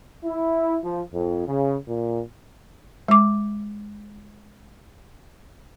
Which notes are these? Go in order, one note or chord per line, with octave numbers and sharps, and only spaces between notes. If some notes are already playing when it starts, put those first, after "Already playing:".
E4
F3
F2
C#3
A#2
G#3 D6